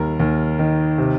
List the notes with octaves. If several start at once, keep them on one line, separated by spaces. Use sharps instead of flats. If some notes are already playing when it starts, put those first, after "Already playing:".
Already playing: D#2 G3 A#4
D#2
D#3
C3